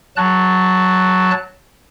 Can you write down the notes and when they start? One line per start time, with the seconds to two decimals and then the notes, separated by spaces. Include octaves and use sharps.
0.17 F#3 A5 F#6